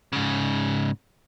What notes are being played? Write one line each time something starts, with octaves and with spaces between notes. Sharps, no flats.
G#2 C#3